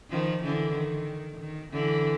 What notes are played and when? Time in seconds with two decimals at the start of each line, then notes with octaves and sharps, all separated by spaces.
0.11 D#3 F3
0.44 D3 E3
0.76 D#3
1.40 D#3
1.72 D3 E3